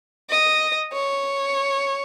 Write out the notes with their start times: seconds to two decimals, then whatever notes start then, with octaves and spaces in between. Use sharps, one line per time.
0.30 D#5
0.93 C#5